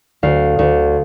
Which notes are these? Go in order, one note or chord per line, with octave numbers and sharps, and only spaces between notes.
D2 F5
D2